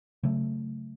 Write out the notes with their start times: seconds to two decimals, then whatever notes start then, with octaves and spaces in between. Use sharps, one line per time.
0.23 C#3 F#3 A3